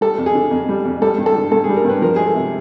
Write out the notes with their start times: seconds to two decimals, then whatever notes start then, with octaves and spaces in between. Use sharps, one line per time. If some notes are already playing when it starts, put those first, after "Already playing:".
0.01 G3 A4
0.18 F2
0.26 G#4
0.35 D3
0.51 F2
0.69 G3
0.85 F2
1.02 G3 A4
1.18 G2
1.26 A4
1.35 D3
1.52 G2 A4
1.64 G#4
1.69 G3
1.76 A#4
1.85 G2 B4
2.02 F3 A#4
2.16 G#3 G#4
2.26 A4
2.34 C3